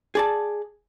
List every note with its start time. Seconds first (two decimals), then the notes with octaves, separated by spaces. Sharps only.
0.15 G#4 D5 A5